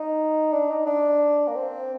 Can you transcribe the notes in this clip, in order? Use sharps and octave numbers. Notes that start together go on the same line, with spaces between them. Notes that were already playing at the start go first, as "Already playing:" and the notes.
Already playing: D#4
D4
D#4
D4
A#3
C4